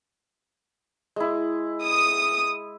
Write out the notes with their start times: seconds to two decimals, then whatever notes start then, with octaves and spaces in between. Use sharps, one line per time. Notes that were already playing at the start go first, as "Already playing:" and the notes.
1.16 G#3 E4
1.84 D#6